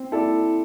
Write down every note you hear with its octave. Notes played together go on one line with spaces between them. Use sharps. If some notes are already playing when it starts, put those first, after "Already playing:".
Already playing: C4
E4 A4 D5